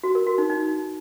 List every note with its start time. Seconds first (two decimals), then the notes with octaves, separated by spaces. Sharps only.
0.04 F#4
0.15 A#4
0.27 F#4
0.38 D#4
0.50 D#4